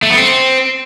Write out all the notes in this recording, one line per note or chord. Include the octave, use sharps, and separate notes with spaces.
A3
B3
C4